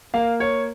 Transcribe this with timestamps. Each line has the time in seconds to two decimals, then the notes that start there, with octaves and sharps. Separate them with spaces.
0.14 A#3 F5
0.40 C#5